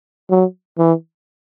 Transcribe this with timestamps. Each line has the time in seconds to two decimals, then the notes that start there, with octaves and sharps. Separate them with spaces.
0.30 F#3
0.78 E3